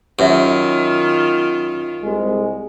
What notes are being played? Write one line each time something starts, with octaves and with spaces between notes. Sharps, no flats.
F#2 D#3 F4 G4 C#5 E5
C2 G#3